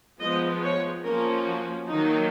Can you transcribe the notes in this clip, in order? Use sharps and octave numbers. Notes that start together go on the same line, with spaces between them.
F3 G#3 B3 D#5
C#5
F3 A#3 C#4 A#4
F#4
D#3 F#3 A#3 D#4